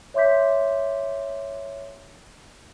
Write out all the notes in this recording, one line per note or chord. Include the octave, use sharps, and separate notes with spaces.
C#5 E5 C6 D6 G6 B6